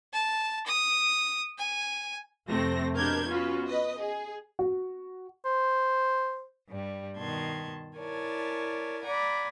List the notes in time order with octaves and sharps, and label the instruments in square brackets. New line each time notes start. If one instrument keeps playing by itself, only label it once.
[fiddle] A5
D#6
G#5
[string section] F2 C3 A3 C4 A#6
B2 D4 G4 A#4 G6 G#6
B3 C#4 F4 F#4 B4
B4 D#5
G#4
[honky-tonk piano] F#4
[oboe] C5
[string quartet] G2 G3
B2 D#3 A5 C6 G#6
E4 A#4 C#5 D5 G#5 A5
D5 F#5 G#5 A#5 B5 D6